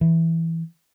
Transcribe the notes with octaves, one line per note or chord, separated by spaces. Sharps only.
E3